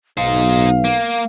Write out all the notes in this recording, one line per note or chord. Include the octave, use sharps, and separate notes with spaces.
B1 D#4 C5 F5
A#3